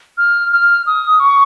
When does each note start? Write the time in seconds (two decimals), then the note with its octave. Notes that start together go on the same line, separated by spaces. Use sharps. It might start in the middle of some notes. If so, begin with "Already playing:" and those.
0.18 F6
0.52 F6
0.87 D#6
1.20 C#6